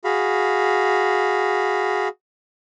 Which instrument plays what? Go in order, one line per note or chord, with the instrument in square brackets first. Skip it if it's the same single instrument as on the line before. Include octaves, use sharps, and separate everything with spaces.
[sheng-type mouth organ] F#4 G#4 F5 B5